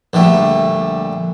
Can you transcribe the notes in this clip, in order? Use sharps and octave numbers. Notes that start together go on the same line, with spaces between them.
A#1 D3 G3 A3